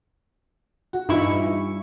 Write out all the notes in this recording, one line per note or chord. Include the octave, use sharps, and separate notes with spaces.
F#4
G2 A#2 E3 D#4 E4 C#6